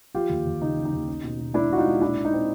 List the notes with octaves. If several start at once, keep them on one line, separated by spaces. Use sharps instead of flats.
F3 F4 G4
D#2
D#2
C#3 D#4
C#3
D#4
D#2
C#4
B2
B2
G#3 D4 E4
B2 F#4
D#4 F4
G#3
A#2 D4 E4
A#2
D#4
C4